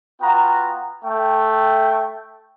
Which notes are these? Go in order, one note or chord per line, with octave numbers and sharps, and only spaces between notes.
B3 F4 F#4 G5 A#5
A3 G5